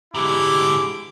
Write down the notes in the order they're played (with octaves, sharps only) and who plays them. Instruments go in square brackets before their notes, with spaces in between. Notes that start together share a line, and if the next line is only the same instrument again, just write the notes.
[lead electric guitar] G#2 D3 [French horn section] B2 G#3 G4 [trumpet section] E4 D6